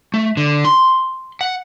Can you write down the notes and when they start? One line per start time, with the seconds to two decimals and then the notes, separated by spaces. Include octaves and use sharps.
0.14 A3
0.37 D3
0.65 C6
1.41 F#5